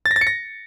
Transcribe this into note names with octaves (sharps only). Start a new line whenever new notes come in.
A6
A#6
A6
C#7
A#6